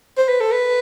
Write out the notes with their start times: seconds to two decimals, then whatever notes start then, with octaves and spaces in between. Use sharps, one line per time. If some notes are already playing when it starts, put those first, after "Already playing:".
0.17 C5
0.28 B4
0.40 A4
0.52 B4